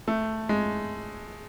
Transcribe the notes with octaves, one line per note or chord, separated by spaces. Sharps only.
A3
G#3